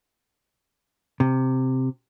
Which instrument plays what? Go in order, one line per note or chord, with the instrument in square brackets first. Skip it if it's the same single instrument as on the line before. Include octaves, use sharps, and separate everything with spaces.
[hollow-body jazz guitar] C3